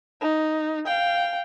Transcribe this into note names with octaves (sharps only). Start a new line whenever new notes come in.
D#4
F5 G5